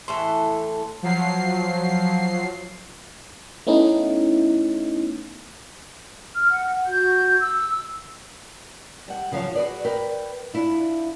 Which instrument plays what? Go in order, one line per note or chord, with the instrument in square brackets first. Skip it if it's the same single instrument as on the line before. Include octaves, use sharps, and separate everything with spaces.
[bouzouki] A2 E3 A4 [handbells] C6
[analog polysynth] F3 F#3 C7
[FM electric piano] A3 B3 C#4 D#4 E4
[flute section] F6
F#5
F#4 G6
E6
[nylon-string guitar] G3 F#5
C#3 F3 F#3 C#5
F#4 G#4 B4 D5
A#4 B4 D5 G5
D4 E4 F4